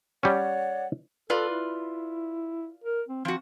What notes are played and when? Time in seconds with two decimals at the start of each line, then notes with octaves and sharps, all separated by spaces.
0.23 G3 C#4 C#5 D5 F#5
1.30 F4 A4 B4 D5
1.49 E4
2.84 A#4
3.08 C4
3.25 F3 C4 F#4